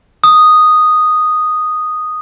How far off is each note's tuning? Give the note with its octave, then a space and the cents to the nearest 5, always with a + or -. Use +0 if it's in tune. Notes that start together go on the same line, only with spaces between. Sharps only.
D#6 -5